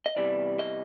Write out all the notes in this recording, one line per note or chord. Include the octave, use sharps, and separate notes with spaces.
D#5
E2 C3 E3 G3 D5
D#5